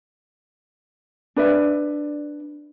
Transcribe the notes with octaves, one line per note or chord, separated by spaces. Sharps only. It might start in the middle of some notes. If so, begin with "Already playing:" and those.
D4 B4 D5 E5